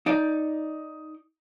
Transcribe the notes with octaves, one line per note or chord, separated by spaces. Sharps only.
D#4 D5